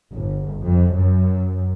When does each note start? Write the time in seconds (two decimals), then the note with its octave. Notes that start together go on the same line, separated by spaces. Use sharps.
0.13 G1
0.62 F2
0.94 F#2